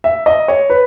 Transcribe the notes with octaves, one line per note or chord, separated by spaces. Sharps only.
E5
D#5
C#5
B4